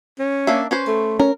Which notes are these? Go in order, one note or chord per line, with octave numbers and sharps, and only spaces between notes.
C#4
A#3 D4 E5
C#4 B4 C5
A3
C#4 A#4